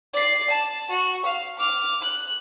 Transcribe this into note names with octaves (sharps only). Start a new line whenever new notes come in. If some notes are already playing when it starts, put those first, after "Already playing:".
D5 C7
A5
F#4
F5
D6 F6
F#6